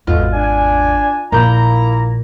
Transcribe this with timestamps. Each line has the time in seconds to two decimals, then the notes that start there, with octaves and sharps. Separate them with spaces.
0.07 G#1 E2 B2 D3 G#3 F4
0.33 D4 G#5
1.32 A#1 A#2 A#3 E4 A#5 G6